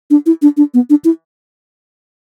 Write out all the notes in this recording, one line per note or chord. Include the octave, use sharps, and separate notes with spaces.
D4
E4
D4
D4
B3
D4
E4